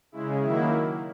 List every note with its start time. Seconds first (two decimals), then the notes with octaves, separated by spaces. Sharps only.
0.12 C#3 G#3 E4
0.42 D#3 F#3 A#3 E4